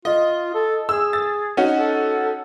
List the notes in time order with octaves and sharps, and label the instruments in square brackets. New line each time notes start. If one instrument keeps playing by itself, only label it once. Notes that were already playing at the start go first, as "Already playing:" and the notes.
[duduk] F4 [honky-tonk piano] D#5
[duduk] A4
[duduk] G#4 [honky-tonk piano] E6
[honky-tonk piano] A6
C#4 D#4 F#4
[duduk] A4